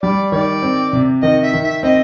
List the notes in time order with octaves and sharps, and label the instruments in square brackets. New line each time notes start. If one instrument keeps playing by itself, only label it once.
[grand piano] G3 [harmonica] D5
[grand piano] D#3 [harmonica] D5
[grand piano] C4
C3
[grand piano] D#3 [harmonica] D#5
[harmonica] E5
[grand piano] D#3
[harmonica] E5
[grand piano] C4 [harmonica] D#5